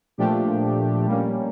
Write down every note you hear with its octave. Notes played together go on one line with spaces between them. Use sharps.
A#2 F3 A3 D4 G4
G3 A#3 C#4